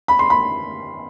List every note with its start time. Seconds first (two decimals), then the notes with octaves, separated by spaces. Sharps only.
0.08 B5
0.19 C6
0.30 B5